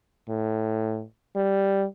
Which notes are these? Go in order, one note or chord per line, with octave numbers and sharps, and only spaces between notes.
A2
G3